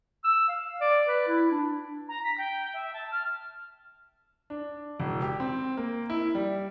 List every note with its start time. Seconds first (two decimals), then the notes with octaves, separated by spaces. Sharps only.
0.24 E6
0.48 F5
0.81 D5
1.07 B4
1.28 E4
1.51 D4
2.08 A#5
2.23 B6
2.37 G5
2.73 E5
2.93 A5
3.11 F6
4.50 D4
5.00 E1
5.22 G4
5.40 C4
5.77 A#3
6.10 E4
6.35 G3